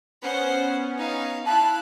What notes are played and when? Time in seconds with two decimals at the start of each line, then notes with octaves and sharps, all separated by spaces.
0.22 B3 C#4 C5 F#5
0.97 D#4 F5
1.46 E4 F5 A5 B5 F#6